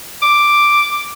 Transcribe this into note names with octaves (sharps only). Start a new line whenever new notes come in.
D6